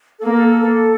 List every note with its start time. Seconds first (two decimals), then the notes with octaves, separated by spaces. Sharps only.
0.18 A4
0.24 A#3 A#4
0.36 A4
0.47 A4
0.59 A4